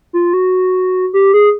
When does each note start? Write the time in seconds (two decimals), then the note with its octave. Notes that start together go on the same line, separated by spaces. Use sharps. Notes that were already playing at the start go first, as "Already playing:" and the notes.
0.13 F4
0.33 F#4
1.13 G4
1.34 G#4